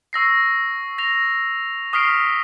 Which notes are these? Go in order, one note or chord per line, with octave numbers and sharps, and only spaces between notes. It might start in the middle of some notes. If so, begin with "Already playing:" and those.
C#6 E6 A#6 C7
A#6 F7
C#6 D#6 F6 B6 C7 D7